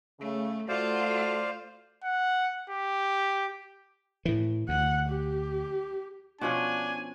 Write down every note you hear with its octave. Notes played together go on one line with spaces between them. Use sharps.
C#3 A3
A3 F4 F#4 A4 C5 D5 F5
F#5
G4
A2 E3
D2 F#5
G4
B2 F3 C#4 D4 G#5